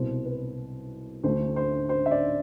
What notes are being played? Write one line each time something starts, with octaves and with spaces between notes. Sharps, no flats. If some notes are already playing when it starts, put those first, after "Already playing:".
Already playing: C2 B2 G3 C5
B4
D2 D3 A3 C5
C5
C5
E5
D5